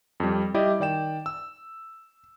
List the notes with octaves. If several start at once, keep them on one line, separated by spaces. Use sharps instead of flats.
F2 G3
G3 E4 G4 D5 D#5
D#3 D5 G5 E7
E6